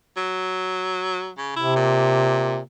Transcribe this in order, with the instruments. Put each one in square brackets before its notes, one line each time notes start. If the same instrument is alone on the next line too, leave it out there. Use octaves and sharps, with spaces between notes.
[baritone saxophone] F#3
C#3
[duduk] C3 [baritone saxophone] E4
[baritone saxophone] A#2